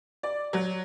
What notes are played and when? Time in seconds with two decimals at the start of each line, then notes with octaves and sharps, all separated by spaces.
0.23 D5
0.53 F#3